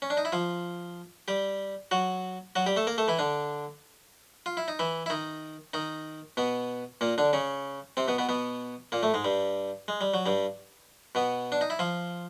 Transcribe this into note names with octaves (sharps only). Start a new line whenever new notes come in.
C#4
D4
D#4
E4
F3 F4
G3 G4
F#3 F#4
F#3 F#4
G3 G4
A3 A4
A#3 A#4
A3 A4
E3 E4
D3 D4
F4
E4
D#4
E3 E4
E4
D#3 D#4
D#3 D#4
B2 B3
A#2 A#3
D3 D4
C#3 C#4
C3 C4
B2 B3
B2 B3
B2 B3
A#2 A#3
A2 A3
G#2 G#3
G2 G3
G#3
G3
F#3
G2 G3
B2 B3
D4
D#4
E4
F3 F4